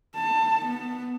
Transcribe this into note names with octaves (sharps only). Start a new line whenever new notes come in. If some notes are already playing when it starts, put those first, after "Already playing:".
A5
B3